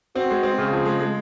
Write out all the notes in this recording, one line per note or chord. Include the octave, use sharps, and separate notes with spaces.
C4 F#4
G#3
C4
C#3 G#4
F3
G#3
G#3